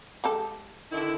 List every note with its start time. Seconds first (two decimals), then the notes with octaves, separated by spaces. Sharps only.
0.24 G#3 G4 A4
0.92 D3 D#3 E4